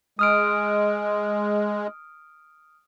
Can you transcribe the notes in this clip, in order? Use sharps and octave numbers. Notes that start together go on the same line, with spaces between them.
G#3 D#6 F6 D7